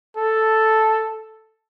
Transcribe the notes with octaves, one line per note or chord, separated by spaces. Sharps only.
A4